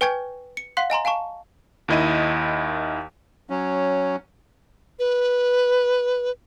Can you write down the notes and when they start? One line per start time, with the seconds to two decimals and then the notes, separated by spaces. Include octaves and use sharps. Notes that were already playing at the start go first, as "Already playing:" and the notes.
0.01 B4 G5 G#5 C#6 G6 G#6
0.57 C#7
0.77 F5 F#5 C6 F#6 B6
0.90 D#5 G#5 A#5 C6
1.05 F5 G#5 A5 C#6
1.88 D#2 D#3 E4 D#5 D#7
3.50 F#3 C#4
4.99 B4